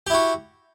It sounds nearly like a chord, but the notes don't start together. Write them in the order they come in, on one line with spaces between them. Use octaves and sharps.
G4 E4 F#4